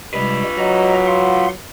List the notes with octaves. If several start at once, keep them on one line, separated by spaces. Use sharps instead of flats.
C3 G3 G#3 F4 B4
F#3 D#5 A#5
F5 F#5 C6